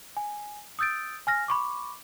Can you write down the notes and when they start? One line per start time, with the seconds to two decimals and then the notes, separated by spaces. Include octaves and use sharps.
0.17 G#5
0.79 D#6 E6 G6 A6 D7
1.27 G#5 F6 A#6
1.48 B5 C#6 D6